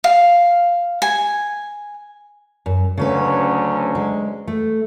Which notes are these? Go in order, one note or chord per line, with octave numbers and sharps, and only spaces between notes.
F5
G#5
F#2
D2 C#3 F#3 A3 C#4 B4
G#3
A3